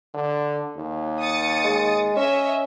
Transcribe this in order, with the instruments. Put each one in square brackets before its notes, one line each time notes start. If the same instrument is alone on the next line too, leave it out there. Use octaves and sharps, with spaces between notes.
[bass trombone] D3
D#2
[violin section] D#6 A6 C#7
[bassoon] G#3
[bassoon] C#4 [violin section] C#5 D#5 E5